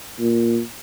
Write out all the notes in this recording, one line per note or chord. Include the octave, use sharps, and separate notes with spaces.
A#2